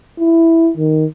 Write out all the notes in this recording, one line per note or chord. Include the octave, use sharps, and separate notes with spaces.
E4
D#3